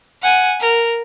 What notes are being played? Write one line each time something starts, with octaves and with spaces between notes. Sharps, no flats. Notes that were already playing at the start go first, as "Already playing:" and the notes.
F#5 G#5
A#4